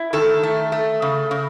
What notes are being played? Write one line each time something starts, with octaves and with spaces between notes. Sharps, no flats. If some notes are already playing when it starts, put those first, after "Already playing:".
Already playing: E4
D#3 A4
A3
A3
C#3
C#3